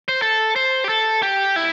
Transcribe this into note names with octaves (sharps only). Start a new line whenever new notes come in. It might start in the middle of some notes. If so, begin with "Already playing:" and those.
C5
A4
C5
G4
A4
G4
E4